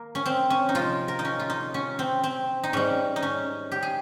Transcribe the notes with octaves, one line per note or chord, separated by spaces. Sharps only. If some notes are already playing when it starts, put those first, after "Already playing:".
Already playing: A#3
C#4
C4
C#4
D#4
C3 F3 G#3 F4
A#4
D#4
C#4
F4
D#4
C#4
C4
C4
D#4
G#2 G3 C#4
D#4
C#4
G4
G#4